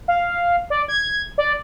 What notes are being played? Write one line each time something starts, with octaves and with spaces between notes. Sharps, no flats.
F5
D5
G#6
D5